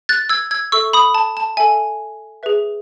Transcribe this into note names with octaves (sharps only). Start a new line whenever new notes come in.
F#6 A6
E6 G#6
E6 G#6
A4 E5 C#6 E6
B5 D#6
A5
A5
A4 E5 G#5
G#4 B4 E5